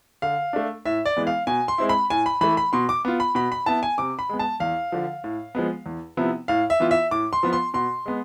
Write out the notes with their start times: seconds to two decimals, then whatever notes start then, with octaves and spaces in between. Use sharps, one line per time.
0.22 D3 F5
0.53 A3 D4
0.85 A2 E5
1.06 D5
1.17 E3 G#3 B3
1.27 F5
1.47 B2 G#5
1.68 C6
1.78 G#3 C4 E4
1.89 B5
2.10 A2 G#5
2.26 B5
2.41 E3 A3 B5
2.57 B5
2.73 B2 C6
2.89 D6
3.05 B3 F4
3.20 B5
3.35 B2 B5
3.52 B5
3.66 B3 E4 A5
3.83 G#5
3.98 C3 D6
4.19 B5
4.29 G#3 B3
4.39 A5
4.60 E2 F5
4.92 D3 F3
5.24 A2
5.55 F3 G#3 B3
5.86 E2
6.17 C3 F3 B3 E4
6.48 A2 F5
6.70 E5
6.80 E3 B3 F4
6.91 E5
7.11 A2 D6
7.33 C6
7.43 F3 B3 F4
7.53 C6
7.74 B2 C6
8.06 G#3 B3